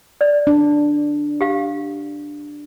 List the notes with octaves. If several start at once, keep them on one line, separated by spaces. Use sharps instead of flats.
D5
D4
G4 F5